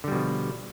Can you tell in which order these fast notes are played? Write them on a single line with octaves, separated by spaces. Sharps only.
D3 G3 B2 F3